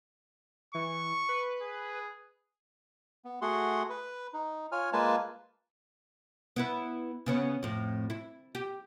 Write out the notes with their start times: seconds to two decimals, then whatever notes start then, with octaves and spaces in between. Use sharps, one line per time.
0.74 E3 C#6
1.29 B4
1.62 G#4
3.25 B3
3.42 A3 F#4 G#4 F#5 C6
3.90 B4
4.33 D#4
4.72 F4 C#5 G#5 F6
4.93 G#3 A#3 F4 B4 G#5 A5
6.56 B3 E4 B4
7.26 C#3 B3 C#4
7.63 F2 A2
8.10 E4
8.55 G4